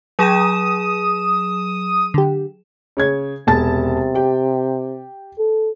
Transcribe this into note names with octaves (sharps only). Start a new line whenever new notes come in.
F#3 G#4 G5 G#5 A#5 D#6 E7
D3 G4
C#3 C#5 G#6
E1 C3 A5 A6
G4 G5
A4